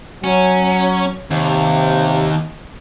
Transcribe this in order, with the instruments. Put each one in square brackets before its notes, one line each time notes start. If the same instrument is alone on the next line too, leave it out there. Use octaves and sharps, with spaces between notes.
[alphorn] F#3 [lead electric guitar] C#4
[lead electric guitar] D#2 [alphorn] C3